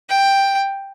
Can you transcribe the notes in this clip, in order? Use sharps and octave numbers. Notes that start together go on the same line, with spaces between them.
G5